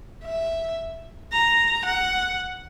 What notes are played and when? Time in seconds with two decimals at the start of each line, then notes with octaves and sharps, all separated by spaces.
0.24 E5
1.33 A#5
1.87 F#5